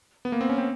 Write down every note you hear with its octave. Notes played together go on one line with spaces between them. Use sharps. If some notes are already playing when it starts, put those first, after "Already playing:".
B3
A#3
C4
C#4
C4